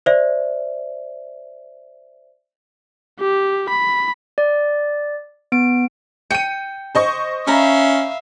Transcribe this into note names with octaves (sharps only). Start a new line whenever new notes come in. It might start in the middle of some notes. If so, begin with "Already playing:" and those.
C5 D5 E5
G4
B5
D5
B3 D7
G5 C#7 D#7
C5 D#5 C#6
C#4 E5 F5 A#5 B5